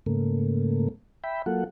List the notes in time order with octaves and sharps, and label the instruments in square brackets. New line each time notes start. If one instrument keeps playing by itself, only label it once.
[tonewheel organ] G#2 C#3 A3 A#3
E5 G5 B5
F#3 A#3 F4 A4 F#5